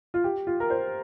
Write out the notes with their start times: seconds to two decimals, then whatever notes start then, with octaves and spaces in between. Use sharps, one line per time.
0.14 F4
0.24 G4
0.47 F4
0.60 A#4
0.70 C5